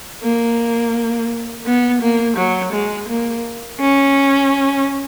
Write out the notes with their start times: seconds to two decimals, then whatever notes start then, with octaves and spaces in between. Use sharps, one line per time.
0.23 A#3
1.66 B3
2.02 A#3
2.37 F#3
2.73 G#3
3.09 A#3
3.80 C#4